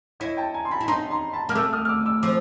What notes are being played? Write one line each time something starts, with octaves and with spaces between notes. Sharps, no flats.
E4 C#5 D#5
G5 A5
G#5 A#5
C6
A5 B5
E4
D#4 A#5 C6
A#5 C6
A5 B5
A#3 F6
A3 D6 E6
D#6 F6
F6
D6 E6
D6 E6
F3 D6 E6